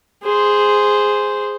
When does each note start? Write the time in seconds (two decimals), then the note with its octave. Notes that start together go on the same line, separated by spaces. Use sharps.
0.23 G#4 C5